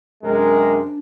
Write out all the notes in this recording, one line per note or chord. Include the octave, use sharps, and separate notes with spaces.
F#2 C3 G#3 D4 A#4